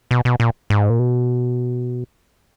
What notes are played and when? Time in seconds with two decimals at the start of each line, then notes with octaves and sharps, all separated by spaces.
0.11 B2
0.25 B2
0.40 A#2
0.70 G#2
0.90 A#2
0.99 B2